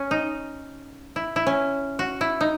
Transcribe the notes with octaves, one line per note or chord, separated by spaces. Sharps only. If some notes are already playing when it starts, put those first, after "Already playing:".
Already playing: C#4
D#4
E4
E4
C#4
F#4
E4
D#4